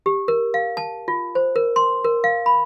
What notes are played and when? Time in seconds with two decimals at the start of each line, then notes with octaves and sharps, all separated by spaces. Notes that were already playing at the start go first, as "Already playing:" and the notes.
0.06 G4
0.28 A#4
0.54 F5
0.77 A5
1.08 F4
1.35 C5
1.56 A#4
1.76 C6
2.04 A#4
2.24 F5
2.46 B5